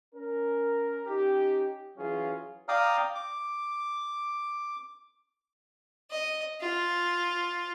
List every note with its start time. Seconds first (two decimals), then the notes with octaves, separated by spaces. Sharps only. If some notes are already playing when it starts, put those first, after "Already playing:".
0.14 C#4 A#4
1.06 C#4 D#4 G4
1.97 E3 F#3 C#4 F4 G#4
2.68 D5 F5 G5 A#5 D#6 F6
3.15 D6
6.11 D#5
6.61 F4